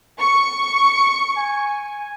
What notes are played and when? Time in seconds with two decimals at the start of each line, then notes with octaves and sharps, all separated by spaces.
0.19 C#6
1.37 G#5